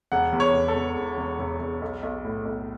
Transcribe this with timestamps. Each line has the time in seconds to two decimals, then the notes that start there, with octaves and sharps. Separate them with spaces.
0.12 E1 F#5
0.33 E2
0.40 C#5
0.54 E1
0.68 A4
0.75 E1
0.97 E1
1.18 E1
1.39 E1
1.60 E1
1.82 B1
2.03 B1
2.24 A2
2.45 B1